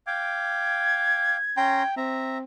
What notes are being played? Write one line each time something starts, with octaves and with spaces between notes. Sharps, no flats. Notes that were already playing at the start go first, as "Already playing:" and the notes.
F5 G5 D6 G#6
C#4 G5 A#5 C6
C4 E5 A#5